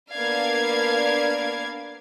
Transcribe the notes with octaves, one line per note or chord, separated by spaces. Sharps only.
A#3 B3 D4 D5 F5 G#6